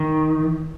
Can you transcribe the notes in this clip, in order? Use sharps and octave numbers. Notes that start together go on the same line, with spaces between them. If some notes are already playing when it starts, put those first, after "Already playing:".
Already playing: D#3